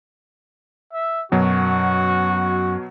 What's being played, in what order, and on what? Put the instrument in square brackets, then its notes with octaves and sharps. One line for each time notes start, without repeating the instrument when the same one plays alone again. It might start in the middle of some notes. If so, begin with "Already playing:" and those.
[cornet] E5
[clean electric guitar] F#2 [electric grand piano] B2 F#3 [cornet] F#4